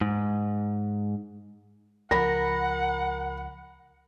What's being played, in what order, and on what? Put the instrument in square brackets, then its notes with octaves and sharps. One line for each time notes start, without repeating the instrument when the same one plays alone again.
[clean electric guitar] G#2
[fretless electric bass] C#2 F3 [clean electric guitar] A#4 [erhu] F#5 [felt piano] B5 A#6